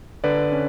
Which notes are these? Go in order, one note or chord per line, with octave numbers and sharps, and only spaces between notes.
D3 B4 D5
C#4